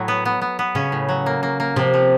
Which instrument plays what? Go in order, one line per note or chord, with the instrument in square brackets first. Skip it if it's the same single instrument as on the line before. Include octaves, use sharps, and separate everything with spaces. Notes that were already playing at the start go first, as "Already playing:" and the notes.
Already playing: [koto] A2 F#3
B3
B3
B3
B3
[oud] C#3 [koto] C#4
[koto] A2
F#3
A#3
A#3
A#3
[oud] C3 [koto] F3
[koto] F3